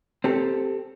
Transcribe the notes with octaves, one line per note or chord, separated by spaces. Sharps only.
C4 G4 A4